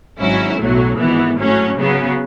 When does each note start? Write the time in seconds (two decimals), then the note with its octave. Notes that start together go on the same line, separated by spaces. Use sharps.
0.20 G#1 G#2 F#3 C#4 E4
0.59 B1 A2 F#3 A3
0.98 G#1 G#2 E3 B3
1.37 A2 F#3 C#4
1.76 C#3 F#3 B3